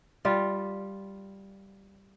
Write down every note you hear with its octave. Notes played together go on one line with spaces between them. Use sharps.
G3 F4